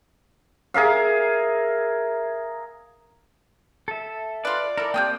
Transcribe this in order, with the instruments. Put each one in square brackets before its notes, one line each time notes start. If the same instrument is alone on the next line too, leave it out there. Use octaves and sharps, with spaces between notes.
[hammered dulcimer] G#4 A#4 E5 F5
[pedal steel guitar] A4 E5
[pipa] F4 B4 [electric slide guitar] D5
[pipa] E4 A4 [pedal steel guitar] A#4
[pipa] C3 F3 G5 [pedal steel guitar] A#3 D#6 G6